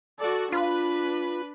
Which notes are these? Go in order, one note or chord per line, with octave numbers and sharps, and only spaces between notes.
F#4 A4 D5
D4 F4 B4